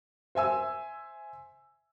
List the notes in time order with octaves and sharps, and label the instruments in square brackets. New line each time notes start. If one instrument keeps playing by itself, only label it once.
[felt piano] C5 E5 G#5 E6